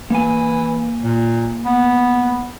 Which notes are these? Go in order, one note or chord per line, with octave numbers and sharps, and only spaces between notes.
E3 A#3 G#5
A#2
B3